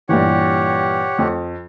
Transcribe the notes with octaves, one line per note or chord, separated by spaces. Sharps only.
G2 A#2 E3 G4 C#5 F#5
F2